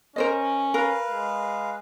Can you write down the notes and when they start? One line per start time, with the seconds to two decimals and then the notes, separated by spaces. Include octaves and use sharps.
0.16 C#4 A#4 C5 D#5
0.74 A#4 B4 F5
1.10 G#3